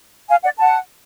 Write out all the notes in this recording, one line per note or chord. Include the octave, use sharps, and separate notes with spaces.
F5 G#5
D5 F#5
F#5 A5